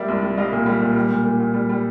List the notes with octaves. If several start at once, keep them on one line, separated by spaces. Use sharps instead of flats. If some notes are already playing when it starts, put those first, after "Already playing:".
Already playing: G3 A#3 D5 E5
C2
G3
G3 D#5 F5
A#2
G3
A#2
G3
A#2
A#2
A#2
G3
G3